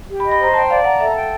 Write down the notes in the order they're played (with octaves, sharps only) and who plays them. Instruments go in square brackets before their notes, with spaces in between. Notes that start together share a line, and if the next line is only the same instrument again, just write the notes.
[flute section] G4
[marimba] B5
[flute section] D#5
[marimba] B5
[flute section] C5 [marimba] A#5
[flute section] G5 [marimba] A5
[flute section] D5 [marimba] F5
[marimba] F#5 [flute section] A#5
[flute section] A4 [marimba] E5
[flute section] G5